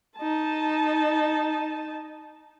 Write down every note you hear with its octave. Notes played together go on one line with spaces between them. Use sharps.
D#4 A5